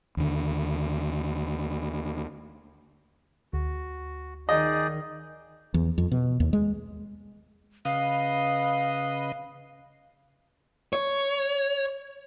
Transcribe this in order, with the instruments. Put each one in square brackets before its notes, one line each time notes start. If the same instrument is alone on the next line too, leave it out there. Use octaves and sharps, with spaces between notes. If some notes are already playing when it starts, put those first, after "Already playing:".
[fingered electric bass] D#2 D3
[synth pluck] D2 [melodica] F#4
[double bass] D#3 [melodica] D#4 G#4 D5 [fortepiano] D#5
[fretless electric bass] E2
F2
B2
D#2
G#3
[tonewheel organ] C#3 B4 D#5 [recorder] F5
[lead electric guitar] C#5